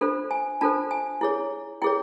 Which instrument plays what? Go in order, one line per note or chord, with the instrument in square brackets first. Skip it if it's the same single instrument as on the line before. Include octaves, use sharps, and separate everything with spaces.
[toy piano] D4 F4 A4 C5
G#5
D4 F4 A4 C5 A5
G#5
E4 G#4 C#5
E4 G#4 C#5 G5